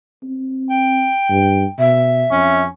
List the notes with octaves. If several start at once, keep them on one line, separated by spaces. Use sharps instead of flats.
C4
G5
G2
B2 E5
F2 C#4